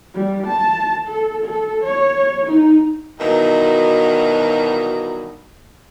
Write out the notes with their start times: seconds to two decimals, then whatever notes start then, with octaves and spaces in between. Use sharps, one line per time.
0.15 G3
0.47 A5
1.07 A4
1.44 A4
1.84 C#5
2.47 D#4
3.19 G2 B2 D#3 E3 F#3 D#4